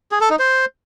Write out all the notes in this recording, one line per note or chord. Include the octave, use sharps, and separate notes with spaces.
G#4
A4
D#4
C5